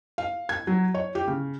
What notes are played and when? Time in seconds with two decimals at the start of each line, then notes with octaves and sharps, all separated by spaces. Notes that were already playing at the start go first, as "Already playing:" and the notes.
0.18 F5
0.49 G#6
0.67 F#3
0.94 C#5
1.15 G4
1.27 C#3